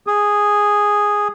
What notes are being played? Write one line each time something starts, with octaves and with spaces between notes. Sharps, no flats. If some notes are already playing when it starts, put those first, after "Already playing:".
G#4